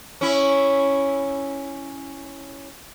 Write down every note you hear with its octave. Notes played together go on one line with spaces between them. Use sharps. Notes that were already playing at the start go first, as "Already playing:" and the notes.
C#4 E4